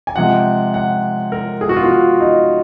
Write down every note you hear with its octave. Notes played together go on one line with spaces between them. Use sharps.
G#5
C3 F3 G#3 F#5
F#5
A#4
G#4
F#4
F4
F#4
F4
D#4